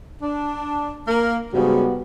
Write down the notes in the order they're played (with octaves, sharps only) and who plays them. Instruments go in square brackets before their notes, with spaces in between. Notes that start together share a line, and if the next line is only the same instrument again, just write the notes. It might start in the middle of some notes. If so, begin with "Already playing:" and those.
[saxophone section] D4
A#3 A#4
[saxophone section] G#2 C#3 [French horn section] G3 B3 F#4